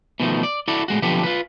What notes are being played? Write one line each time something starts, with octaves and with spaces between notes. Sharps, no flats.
B2 D#3 F3 A3
D5
E4 F#4 A4 D5
A2 G#3 F#4
B1 D3 F3 B3 G4
F4 B4